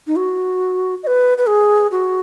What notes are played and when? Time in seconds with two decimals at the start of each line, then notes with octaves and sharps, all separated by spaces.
0.07 D#4
0.16 F#4
1.03 D#5
1.07 B4
1.38 B4
1.48 G#4
1.92 F#4